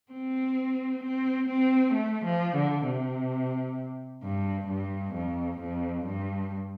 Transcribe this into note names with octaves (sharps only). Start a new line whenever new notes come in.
C4
C4
C4
A3
F3
D3
C3
G2
G2
F2
F2
G2